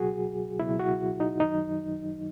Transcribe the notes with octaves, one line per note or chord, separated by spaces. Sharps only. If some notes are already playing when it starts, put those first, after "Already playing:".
Already playing: C#2 B2 F#3 F#4 G#4
C#2 B2 F#3 E4
F#4
D#4
F#2 D#3 F#3 D#4